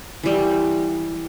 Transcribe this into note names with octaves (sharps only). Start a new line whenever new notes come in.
E3 G3